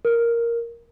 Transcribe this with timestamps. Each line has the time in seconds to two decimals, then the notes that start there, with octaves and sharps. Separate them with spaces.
0.05 A#4